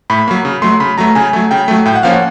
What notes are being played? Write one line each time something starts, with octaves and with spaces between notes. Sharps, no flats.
A2 B5
F#3 A#3
C#3
F#3 A3 C6
C#3 B5
F#3 A3 A#5
C#3 G#5
F#3 A3
C#3 G5
F#3 A3
A2 G5
F#5
F3 A#3 C#4 F5
F#5